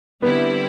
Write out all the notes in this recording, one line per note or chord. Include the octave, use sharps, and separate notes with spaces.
D3 G3 B3 C4 E4